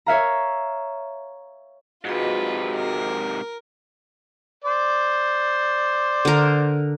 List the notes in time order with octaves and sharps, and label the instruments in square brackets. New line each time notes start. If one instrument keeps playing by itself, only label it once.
[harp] C#5 E5 F5 A#5
[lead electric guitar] G#2 C3 [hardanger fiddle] F4 B4 [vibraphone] F#4 G#4 D#5
[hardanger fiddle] A#4
[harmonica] C5 D5
[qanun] D3 A#4